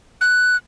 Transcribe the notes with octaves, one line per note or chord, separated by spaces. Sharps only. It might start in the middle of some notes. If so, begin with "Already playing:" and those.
F#6